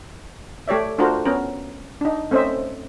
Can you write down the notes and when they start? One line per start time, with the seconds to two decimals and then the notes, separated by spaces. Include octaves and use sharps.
0.68 A3 G4 C#5 D5 E5
0.98 A3 D4 F4 F#4 A#4 C5
1.26 B3 C#4 A#4
2.01 D4 D#4
2.31 A3 C4 C#4 C5 D#5 E5